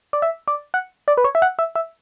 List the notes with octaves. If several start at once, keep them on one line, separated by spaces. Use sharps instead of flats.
D5
E5
D5
F#5
D5
B4
C#5
E5
F#5
E5
E5